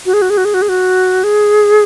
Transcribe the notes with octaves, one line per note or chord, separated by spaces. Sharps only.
F#4
G#4
F#4
G#4
F#4
G#4
F#4
G#4
F#4
G#4